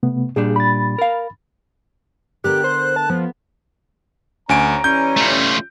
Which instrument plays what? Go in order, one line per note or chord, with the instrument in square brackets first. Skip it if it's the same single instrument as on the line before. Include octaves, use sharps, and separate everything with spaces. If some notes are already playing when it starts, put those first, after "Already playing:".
[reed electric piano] C3 A3 B3
[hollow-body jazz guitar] A#2 G3 D4 [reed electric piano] G#4
[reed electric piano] B5 A6
[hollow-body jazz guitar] A#4 F5
[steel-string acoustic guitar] D3 B3 A#4 [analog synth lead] G4 [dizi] F#6
[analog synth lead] C5
A5
[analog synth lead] F3 [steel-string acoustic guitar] B3
[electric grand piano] D2 G#5 D7 [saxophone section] C#4 [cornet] A#5
[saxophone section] E3 G3 C#4 [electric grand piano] G6
[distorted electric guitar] A3 F4